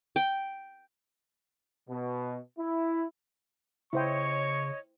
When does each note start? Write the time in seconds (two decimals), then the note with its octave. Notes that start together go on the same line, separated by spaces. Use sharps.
0.16 G5
1.89 B2
2.59 E4
3.93 C#3 E4 C5 C#5 D#5 G5 C#6